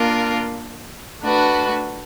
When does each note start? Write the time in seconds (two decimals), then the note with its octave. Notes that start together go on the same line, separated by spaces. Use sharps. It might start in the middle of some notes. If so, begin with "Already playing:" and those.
Already playing: A#3 D4 F4 A#4
1.21 A3 D4 F#4 B4